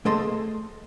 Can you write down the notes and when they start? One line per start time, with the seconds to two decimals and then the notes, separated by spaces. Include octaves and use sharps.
0.05 A3 G#4 A4 D#5 C6